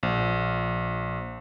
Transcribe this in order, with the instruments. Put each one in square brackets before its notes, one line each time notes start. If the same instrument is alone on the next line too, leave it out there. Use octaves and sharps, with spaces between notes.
[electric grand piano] A#1